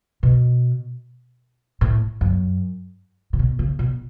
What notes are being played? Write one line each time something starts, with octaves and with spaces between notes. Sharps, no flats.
B2
A2
F#2
C#3
B2
C#3
B2